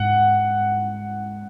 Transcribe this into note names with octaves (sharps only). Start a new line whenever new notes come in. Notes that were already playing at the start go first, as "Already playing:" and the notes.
Already playing: G#2 F#5